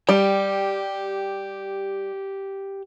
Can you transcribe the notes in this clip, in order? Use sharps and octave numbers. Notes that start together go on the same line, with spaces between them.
G3 G4